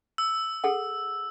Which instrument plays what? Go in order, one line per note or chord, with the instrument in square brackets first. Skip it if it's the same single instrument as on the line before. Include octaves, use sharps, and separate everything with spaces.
[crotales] E6
[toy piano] G#4 A4 F#5